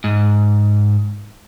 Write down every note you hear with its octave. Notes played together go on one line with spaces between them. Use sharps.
G#2